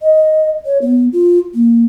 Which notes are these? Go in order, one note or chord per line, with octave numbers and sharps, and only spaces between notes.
D#5
C#5
B3
F4
A#3